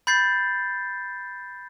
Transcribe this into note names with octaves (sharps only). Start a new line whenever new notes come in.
B5 G6 A6 C7